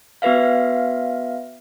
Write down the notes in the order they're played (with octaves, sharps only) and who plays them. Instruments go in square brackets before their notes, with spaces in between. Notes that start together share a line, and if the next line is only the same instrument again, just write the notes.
[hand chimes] B3 F#4 B4 E5 F5